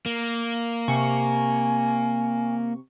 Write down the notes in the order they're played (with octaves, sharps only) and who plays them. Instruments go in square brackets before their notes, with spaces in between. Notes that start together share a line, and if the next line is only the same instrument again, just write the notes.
[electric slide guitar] A#3
[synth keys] C3 C#6 [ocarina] G#5